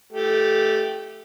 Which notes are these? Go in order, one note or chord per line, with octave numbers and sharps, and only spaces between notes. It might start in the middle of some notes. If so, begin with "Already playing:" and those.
A3 G4